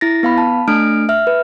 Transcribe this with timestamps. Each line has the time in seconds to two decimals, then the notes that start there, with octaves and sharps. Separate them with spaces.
0.01 E4 A6 A#6
0.23 B3 F5 B5
0.38 A5
0.68 A3 D4 F6 D7
1.09 E5 F6
1.27 B4